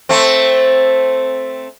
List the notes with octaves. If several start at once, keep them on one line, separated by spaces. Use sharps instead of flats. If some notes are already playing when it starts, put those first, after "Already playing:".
A3 C4